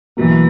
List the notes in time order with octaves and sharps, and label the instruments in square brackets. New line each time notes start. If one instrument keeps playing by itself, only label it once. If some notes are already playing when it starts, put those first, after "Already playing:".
[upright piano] B1 B2 F#3 A#3 [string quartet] E3